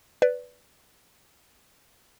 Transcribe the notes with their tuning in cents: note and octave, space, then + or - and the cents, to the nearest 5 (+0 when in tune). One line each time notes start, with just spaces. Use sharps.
B4 +0 D5 -15